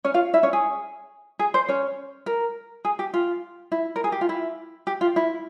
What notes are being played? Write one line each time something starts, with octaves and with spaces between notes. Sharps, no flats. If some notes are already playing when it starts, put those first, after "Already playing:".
C#4 C#5
F4 F5
E4 E5
C#4 C#5
G#4
G#4
C5
C#4 C#5
A#4
G#4
G4
F4
E4
A#4
G#4
G4
F4
E4
G4
F4
E4